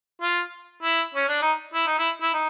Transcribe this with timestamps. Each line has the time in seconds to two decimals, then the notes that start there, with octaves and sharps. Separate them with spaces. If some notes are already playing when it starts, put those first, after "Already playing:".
0.22 F4
0.83 E4
1.14 C#4
1.29 D4
1.42 D#4
1.74 E4
1.87 D#4
1.99 E4
2.22 E4
2.33 D#4